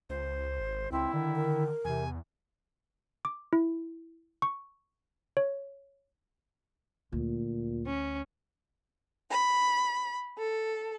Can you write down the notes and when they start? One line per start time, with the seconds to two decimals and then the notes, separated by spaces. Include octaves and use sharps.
0.10 C#2 C5
0.60 G#1
0.92 C#2 C4 E4
1.13 D3 D#3
1.35 A#4
1.85 E2 C3 G#5
3.25 D6
3.53 E4
4.42 C#6
5.37 C#5
7.12 D2 A#2
7.86 C#4
9.31 B5
10.38 A4